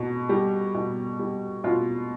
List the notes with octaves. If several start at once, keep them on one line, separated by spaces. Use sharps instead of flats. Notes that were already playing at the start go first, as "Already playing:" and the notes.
Already playing: B2
G3
B2
G3
B2 F4